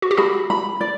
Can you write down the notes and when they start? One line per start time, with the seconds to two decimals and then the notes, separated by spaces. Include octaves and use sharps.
0.02 F#4
0.11 G4
0.17 F#4 G#4 B5
0.50 B5
0.81 D5